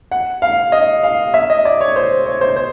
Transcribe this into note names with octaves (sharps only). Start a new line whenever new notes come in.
F#5
F5
D#5
F5
E5
D#5
D5
C#5
C5
C#5
C5
C5